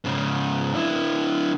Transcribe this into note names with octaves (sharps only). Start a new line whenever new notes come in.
G#2 C#3
D3 E4